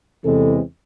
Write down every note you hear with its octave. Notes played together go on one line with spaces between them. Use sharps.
E2 C3 E3 G#3 C4 A4